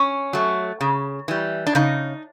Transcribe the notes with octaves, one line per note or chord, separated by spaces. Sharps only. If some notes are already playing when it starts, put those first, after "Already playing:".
Already playing: C#4
F#3 A3
C#3
E3 G3
D4
C#3 D#4